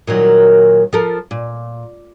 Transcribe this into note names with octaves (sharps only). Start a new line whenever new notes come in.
A#2 D#3 F#3
F3 A4 A#4
A#2